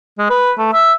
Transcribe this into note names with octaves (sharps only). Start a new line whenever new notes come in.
G#3
B4
A3
E5